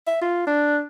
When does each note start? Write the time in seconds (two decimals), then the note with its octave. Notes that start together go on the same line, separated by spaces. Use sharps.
0.07 E5
0.22 F4
0.47 D4